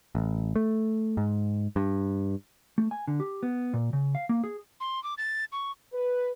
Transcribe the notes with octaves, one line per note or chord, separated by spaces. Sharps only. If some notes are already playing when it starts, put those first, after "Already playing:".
A1
A3
G#2
G2
A3
G#5
D3
G4
B3
A#2
C#3
F5
A#3
G#4
C6
D6
A6
C#6
B4